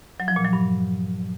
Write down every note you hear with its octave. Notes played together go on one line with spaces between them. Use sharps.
F#3
F3
A#2
F#3
G2